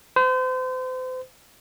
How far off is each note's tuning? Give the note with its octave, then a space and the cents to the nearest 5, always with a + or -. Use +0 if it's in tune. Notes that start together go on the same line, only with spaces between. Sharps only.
C5 -35